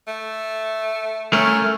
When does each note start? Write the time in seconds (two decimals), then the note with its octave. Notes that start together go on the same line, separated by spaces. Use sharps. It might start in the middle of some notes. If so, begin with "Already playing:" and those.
0.08 A3
1.33 A3 C#4 A#4